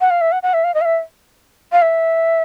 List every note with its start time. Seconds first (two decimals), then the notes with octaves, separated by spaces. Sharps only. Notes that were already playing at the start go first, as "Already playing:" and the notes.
0.01 F#5
0.10 F5
0.21 E5
0.32 F#5
0.43 F#5
0.54 E5
0.64 F5
0.74 D#5
0.81 F5
0.85 E5
1.72 F5
1.82 E5